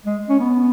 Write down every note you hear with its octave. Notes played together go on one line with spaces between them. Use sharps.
G#3
C#4
B3